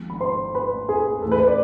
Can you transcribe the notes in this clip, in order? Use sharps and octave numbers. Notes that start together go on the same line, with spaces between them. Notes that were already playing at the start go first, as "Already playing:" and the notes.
Already playing: G#1 G#2 F3
B5
C5 C6
B4 B5
G#4 G#5
A1 A2 E3 A4
B4
C5
D5